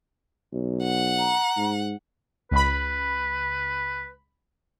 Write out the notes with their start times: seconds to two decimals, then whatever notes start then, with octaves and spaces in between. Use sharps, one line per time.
0.53 B1
0.83 F#5
1.19 A#5
1.57 G#2
2.51 C#2 B4 B5